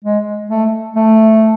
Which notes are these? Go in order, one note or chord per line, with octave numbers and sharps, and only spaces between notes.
G#3
A3
A3